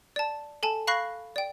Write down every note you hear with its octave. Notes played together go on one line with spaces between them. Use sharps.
D5 A5
A4 G#5 A5
F5 B5 C#6 F#6 A#6 C7
D5 G5